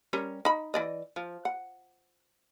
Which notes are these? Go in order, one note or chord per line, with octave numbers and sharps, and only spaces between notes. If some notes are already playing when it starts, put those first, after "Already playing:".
G3 C#4 A#4
D#4 B5
E3 D5 D#5
F3
F#5